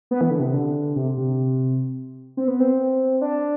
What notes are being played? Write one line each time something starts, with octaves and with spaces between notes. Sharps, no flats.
B3
E3
D3
C3
D3
C3
C3
C4
B3
C4
D4